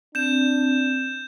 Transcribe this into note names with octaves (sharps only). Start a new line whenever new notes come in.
C4 D4 G6 E7